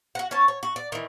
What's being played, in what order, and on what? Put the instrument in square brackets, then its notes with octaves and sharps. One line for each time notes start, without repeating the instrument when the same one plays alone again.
[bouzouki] F#4 F#5
C#4 C#5 A5
C#5
F#4
D5
D#3 E3